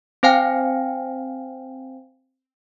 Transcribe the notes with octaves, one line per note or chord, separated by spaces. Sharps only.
C4 C5 F5 G5 G#5